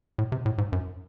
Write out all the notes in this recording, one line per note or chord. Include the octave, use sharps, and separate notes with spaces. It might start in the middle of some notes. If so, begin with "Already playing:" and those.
A2
C3
A2
G#2
F#2